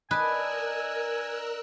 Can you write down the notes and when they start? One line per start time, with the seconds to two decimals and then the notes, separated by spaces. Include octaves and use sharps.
0.11 D4 A#4 B4 D#5 G#5 E6 F#6